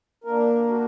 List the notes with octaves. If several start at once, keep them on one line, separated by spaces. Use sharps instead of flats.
D3 A#3 D4 A#4
F#4